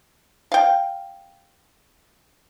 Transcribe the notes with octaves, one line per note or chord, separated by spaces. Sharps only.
F5 G5